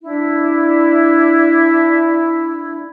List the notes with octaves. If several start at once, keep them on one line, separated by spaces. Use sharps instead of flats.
D4 E4